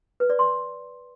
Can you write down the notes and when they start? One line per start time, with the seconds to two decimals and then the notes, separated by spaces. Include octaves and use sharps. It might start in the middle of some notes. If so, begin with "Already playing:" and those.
0.20 B4
0.30 D5
0.39 C6